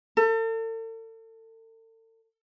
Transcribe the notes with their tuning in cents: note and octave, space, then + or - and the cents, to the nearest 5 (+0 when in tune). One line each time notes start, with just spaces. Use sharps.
A4 +40